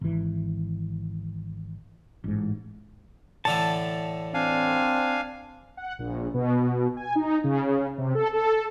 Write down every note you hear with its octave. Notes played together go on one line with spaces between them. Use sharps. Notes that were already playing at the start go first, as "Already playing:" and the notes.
G#1 E3
A1 G#2
A2 D3 E3 A5
C4 D4 F5 G#5
F#5
A#1
B2
G#5
D#4
C#3
C3
A4
A4